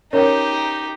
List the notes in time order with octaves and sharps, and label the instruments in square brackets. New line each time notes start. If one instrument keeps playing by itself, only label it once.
[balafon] C#4 A#4 C#5 [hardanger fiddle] D#4 G4